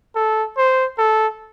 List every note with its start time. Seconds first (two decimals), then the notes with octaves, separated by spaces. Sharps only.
0.16 A4
0.57 C5
0.98 A4